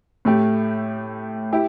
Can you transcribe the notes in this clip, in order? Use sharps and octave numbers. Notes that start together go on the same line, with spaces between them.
A2 A3 G4
E4 G4